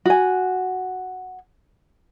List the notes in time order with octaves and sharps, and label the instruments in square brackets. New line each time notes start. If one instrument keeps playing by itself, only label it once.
[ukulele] F#4 G#5